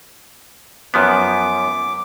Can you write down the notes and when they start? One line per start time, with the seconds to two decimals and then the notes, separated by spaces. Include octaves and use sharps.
0.94 F#2 F3 B3 D6